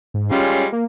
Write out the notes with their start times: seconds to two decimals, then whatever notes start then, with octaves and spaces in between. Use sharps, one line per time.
0.14 G#2
0.32 G3 G#3 C#4 F4
0.72 A#3